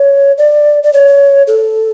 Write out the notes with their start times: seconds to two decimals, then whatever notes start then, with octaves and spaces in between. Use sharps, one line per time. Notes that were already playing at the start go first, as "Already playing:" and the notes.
Already playing: C#5
0.38 D5
0.83 D5
0.93 C#5
1.47 A4